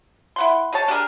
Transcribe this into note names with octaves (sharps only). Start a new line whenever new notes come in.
E4 F#5 C6
D#4 G#4 C#5 A5
D4 G4 G#4 A#4